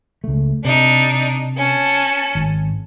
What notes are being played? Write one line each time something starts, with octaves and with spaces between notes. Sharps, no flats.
C#2 A3
C3 D4 D#4
C#4 A5
G#1